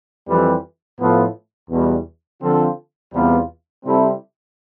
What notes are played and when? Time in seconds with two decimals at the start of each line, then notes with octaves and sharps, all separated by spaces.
0.27 F2 E3 G3 C4 G4
0.99 A2 F3 B3 F4 A4
1.70 E2 B2 G3
2.41 D3 F3 C4 F4 A4
3.13 E2 C3 G3 B3 F4
3.84 C3 G3 C4 E4 A4